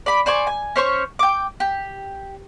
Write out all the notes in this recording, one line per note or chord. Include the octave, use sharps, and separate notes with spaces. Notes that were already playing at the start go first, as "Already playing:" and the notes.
D5 B5
C5 D5 G#5 C#6
G#5
C#4 C5 C#5 C#6
G5 D6
G4